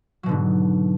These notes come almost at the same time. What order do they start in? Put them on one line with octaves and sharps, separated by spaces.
F#3 B2 D3 G#2